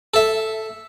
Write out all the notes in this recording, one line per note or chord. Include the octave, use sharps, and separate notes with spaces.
A4 E5